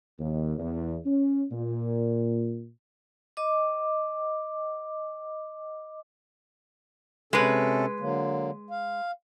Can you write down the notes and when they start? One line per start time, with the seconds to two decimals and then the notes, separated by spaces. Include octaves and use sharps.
0.19 D#2
0.58 E2
1.05 C#4
1.51 A#2
3.37 D#5 D6
7.33 C3 G#3 C#4 A4 B4
8.00 D3 F#3 A#3
8.70 F5